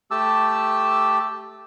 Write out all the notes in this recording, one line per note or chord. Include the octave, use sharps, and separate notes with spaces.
A3 G4 A5 E6